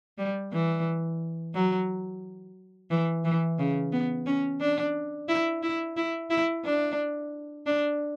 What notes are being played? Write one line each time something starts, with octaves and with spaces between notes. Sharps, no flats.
G3
E3
F#3
E3
E3
C#3
B3
C#4
D4
E4
E4
E4
E4
D4
D4